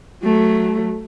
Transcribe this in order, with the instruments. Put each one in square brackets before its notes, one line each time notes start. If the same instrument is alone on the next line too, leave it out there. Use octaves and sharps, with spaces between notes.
[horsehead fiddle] F#3 A3